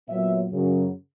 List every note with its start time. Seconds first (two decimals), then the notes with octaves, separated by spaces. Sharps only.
0.09 A#2 F#3 B3 C#5 E5
0.50 F#2 C#3 F#3